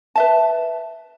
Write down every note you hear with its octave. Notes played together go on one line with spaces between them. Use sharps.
B4 E5 A5